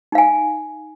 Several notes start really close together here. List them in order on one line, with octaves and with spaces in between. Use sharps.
D#4 F5 G#5